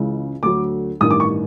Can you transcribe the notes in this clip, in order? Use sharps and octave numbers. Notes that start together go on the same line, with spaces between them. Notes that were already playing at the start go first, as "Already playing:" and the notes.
Already playing: C#2 C#3 E3 G#3
D2 D3 F#3 D6
A1 G2 D#3 D#6
D6
C#6